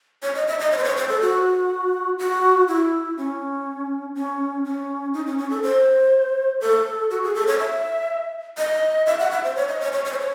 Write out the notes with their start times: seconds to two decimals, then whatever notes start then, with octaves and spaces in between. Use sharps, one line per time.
0.23 C#5
0.35 D#5
0.47 E5
0.59 D#5
0.72 C#5
0.78 C5
0.84 C#5
0.97 C5
1.09 A4
1.21 F#4
2.19 F#4
2.68 E4
3.17 C#4
4.15 C#4
4.64 C#4
5.13 D#4
5.26 C#4
5.38 C#4
5.50 A4
5.63 C5
6.61 A4
7.10 F#4
7.23 G#4
7.35 A4
7.47 C#5
7.59 E5
8.58 D#5
9.06 E5
9.19 F#5
9.31 E5
9.44 C5
9.56 C#5
9.68 D#5
9.80 C#5
9.92 C#5
10.05 C#5
10.12 C5
10.19 C#5